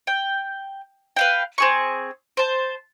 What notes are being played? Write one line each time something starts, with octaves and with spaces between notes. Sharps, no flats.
G5
B4 F5 G5
C4 G#4 C#6
C5 A5